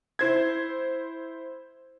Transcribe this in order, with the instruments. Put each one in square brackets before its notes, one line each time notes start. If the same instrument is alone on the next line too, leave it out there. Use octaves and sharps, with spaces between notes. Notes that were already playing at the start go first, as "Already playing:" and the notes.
[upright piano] E4 C5 G#6